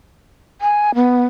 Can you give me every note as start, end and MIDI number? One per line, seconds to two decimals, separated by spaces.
0.61 0.94 80
0.95 1.24 59